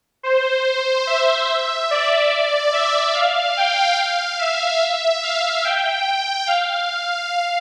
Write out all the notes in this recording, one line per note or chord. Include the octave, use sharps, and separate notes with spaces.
C5
E5
D5
E5
F5
G5
F5
E5
F5
G5
F5